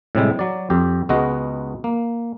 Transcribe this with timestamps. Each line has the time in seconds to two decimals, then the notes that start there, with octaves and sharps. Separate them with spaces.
0.15 A2 C3 G3 G#3
0.39 F#3 D5
0.70 F2 G4
1.09 C#2 G#3 B3 F#4 D#5
1.84 A#3